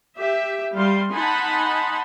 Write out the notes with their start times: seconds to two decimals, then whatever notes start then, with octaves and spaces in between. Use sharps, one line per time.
0.18 G4 E5
0.76 G3 F5 C6
1.12 D#4 F#5 G#5 A5 B5 C6